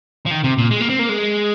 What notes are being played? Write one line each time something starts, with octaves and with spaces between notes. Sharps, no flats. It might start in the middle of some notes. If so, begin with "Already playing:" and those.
F3
D#3
C3
A#2
G#3
A#3
C4
A#3
G#3